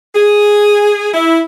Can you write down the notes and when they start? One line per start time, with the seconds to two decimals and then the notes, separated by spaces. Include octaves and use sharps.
0.15 G#4
1.13 E4